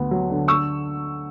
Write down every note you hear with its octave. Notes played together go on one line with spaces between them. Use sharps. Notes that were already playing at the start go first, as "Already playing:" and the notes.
Already playing: D2 B3
F#3
D3
C#6 E6